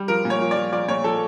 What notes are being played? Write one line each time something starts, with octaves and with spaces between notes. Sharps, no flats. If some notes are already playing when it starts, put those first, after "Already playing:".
Already playing: G3
F3 A#4
A#2
C#5
F3
D5
F3
F3 D5
A#2 C#5
F3 A4